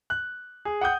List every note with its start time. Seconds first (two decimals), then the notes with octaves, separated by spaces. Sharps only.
0.10 F#6
0.65 G#4
0.81 F#5 G5 D#6 G6